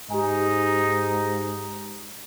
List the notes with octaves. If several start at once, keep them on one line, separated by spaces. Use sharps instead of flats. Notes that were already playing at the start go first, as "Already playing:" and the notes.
G#2 D#4 G4 G#5